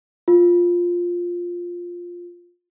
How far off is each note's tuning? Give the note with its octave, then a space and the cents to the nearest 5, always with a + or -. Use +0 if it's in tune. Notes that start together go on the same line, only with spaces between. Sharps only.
F4 +5